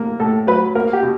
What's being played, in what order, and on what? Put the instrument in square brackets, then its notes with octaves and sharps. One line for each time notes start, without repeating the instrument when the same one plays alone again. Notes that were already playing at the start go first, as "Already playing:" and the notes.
Already playing: [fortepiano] A2 A#3
[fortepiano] A2 [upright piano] A4
[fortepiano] F#3 [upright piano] B4
[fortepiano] A#3 [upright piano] A#4
[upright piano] G4
[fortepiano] B2